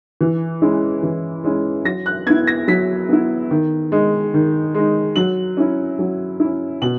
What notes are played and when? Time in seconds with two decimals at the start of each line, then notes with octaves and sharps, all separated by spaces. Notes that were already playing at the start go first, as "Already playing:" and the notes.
0.21 E3
0.62 G#3 C#4 E4
1.03 E3
1.44 G#3 C#4 E4
1.85 F#3 A#6
2.06 F#6
2.26 B3 E4 G#6
2.47 A#6
2.68 F#3 B6
3.09 B3 E4
3.51 D#3
3.92 G#3 D#4
4.34 D#3
4.75 G#3 D#4
5.16 F#3 F#7
5.57 C#4 E4
5.99 F#3
6.40 C#4 E4
6.82 B2 F#7